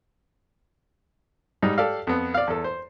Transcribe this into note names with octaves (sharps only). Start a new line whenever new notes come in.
G#2 G3 D#4
G4 A4 D5 F5
F2 B3
D5 F5
E2 A4
C5